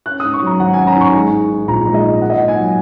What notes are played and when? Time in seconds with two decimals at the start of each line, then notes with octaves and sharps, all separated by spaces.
0.06 C#4 F#6
0.20 D#6
0.24 G#2
0.33 C#6
0.42 F#3 A#5
0.60 G#1 F#5
0.73 G#5
0.78 C#4
0.87 A#5
0.96 G#2 C#6
1.14 G#3
1.31 G#2
1.49 D#3
1.68 A#1 A#5
1.85 G#3
1.94 D#5
2.04 G#2
2.21 A#3 F#5
2.30 D#5
2.37 G#2 F#5
2.48 G#5
2.58 F#3